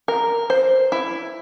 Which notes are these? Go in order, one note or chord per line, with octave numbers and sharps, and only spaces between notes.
A#4
C5
E4